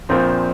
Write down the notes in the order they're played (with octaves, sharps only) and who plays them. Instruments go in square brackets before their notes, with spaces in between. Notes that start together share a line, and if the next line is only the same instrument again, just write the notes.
[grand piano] A#1 A#2 F3 [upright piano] C4